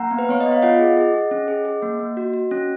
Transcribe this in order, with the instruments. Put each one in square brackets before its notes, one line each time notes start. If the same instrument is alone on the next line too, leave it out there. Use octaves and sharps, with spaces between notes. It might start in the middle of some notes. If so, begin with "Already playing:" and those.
Already playing: [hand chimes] A#3 F#5 A#5
B3
B4
B3 C#5
D#5
B3
F5
F4 D#5 F#5
G#4
G#4
G#4
C#4
G#4
G#4
A#3
A#3
F#4
F#4
C#4